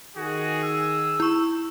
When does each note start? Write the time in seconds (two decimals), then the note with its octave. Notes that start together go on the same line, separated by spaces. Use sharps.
0.17 D#3 F#4 G#4
0.64 E6
1.20 E4 C#6